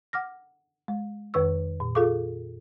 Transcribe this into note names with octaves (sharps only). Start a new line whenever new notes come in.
F#5 D6 F6 A#6
G#3
F2 D#3 B4 C#6 E6
A#2
F4 G#4 A4 F5 C#6 D6